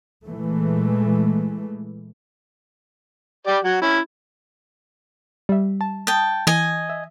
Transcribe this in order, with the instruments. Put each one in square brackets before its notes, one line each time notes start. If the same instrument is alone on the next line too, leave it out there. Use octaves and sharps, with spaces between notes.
[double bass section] A#2 E3 G#3 A3
[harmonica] G4 D5
F#3 F#5
C#4 E4
[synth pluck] G3 E5
A5
[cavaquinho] G5 A5 [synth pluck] D#6
[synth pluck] E3 [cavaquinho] D#5 G#5
[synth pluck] E5